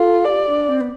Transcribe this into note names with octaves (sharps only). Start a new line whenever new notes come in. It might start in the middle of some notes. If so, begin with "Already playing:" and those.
Already playing: F4 A4
G4 D5
D4
C4
B3